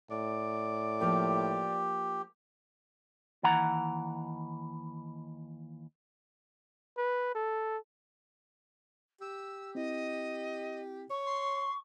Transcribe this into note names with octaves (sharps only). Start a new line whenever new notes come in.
A2 D5
F3 A#3 G4 B4
D#2 E3 F#5 A#5
B4
A4
G4 E6
C4 E4 D#5
C#5 C#6
C6